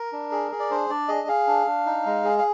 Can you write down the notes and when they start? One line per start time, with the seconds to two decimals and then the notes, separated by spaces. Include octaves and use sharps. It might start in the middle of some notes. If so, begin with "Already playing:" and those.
Already playing: A#4
0.12 D4
0.32 G#4
0.51 G#4
0.60 D5
0.71 D4 C5
0.90 D4 D5
1.08 G#4 D#5
1.28 G#4 F5
1.47 D4
1.67 D4
1.86 D#4
2.06 G#3
2.24 G#4
2.39 F5